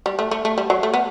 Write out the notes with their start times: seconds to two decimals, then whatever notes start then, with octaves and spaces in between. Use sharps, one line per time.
0.06 G3
0.19 A3
0.31 A3
0.45 A3
0.58 G3
0.70 F#3
0.83 A3
0.94 B3